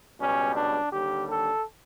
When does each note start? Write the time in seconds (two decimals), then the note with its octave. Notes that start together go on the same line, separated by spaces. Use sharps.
0.19 C#2 B2 G3 C#4
0.56 D4
0.92 D#2 D3 G3 G4
1.30 A4